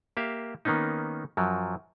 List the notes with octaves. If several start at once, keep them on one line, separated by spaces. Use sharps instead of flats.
A#3 G4 E5 F5
D#3 A#3 B3 C#4 D#4
F#2 F3 F#3